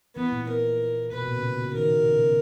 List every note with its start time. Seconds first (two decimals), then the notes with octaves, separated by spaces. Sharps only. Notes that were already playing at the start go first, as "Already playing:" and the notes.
0.16 E3 B3
0.32 A#2
0.49 A#4
1.12 B2 B4
1.22 B2
1.27 A#2
1.37 C#3
1.43 B2
1.59 C#3
1.74 D#3 A#4
2.06 C#3
2.16 B2